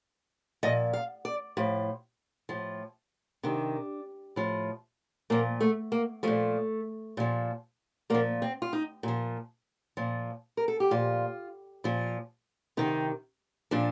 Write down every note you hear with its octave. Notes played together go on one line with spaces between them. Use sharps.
A#2 F3 D#5
F5
D5
A2 F3
A2 F3
C3 D#3 D4
A2 F3
A#2 F3 A#3
A3
A#3
A#2 F3 A3
A#2 F3
A#2 F3 A#3
C4
F4
D#4
A#2 F3
A#2 F3
A#4
A4
G4
A#2 F3 F4
A#2 F3
C3 D#3 D#4
A#2 F3 D4